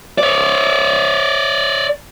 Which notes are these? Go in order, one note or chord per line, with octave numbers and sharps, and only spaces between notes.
C#5 D5